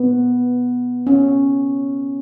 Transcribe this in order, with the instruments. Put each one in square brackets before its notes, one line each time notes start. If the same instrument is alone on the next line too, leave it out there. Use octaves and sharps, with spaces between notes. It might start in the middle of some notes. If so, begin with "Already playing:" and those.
Already playing: [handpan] B3
C#4